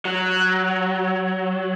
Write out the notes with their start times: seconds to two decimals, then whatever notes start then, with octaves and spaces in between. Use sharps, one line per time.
0.05 F#3